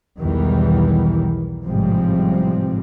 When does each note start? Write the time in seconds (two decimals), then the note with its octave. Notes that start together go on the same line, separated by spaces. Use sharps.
0.19 B1 E2 D#3 E3 G3
1.64 A1 G#2 C3 F3 G3 C4